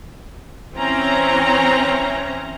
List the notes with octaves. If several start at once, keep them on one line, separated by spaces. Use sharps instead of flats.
E3 C4 C#4 A#5